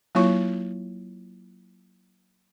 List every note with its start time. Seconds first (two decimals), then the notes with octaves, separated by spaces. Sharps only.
0.15 F#3 A#3 E4 F4 C#5 C#6